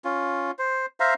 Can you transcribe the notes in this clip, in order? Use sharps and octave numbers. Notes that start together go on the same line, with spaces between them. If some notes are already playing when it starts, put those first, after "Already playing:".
C#4 F4
C5
C5 E5 F5 A#5